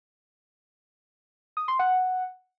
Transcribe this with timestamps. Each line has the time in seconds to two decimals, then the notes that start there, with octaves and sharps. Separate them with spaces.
1.57 D#6
1.68 C6
1.79 F#5